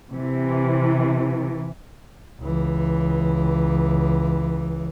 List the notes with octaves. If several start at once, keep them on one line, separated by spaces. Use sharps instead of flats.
C3 E3
C#2 E3